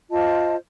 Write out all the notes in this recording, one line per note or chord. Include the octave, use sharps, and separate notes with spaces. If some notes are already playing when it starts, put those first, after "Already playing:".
F4 C5 D#5 A5